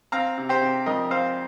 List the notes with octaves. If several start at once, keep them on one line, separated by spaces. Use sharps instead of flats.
C4 F5 A#5
C3
G4 C5
C3
F2 A#4 D#5
C4 C5 F5